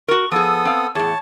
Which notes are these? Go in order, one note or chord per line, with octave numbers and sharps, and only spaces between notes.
F#4 A#4 C#6
F3 B3 G#4 A4 D#6 E6
C4 F5
E2 A2 G#4 C#5 A5